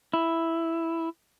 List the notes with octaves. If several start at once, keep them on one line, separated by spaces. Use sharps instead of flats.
E4